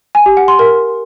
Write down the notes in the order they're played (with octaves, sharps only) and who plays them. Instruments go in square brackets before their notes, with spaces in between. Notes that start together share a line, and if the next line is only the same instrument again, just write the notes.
[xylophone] G#5
G4
F#5
C6
A#4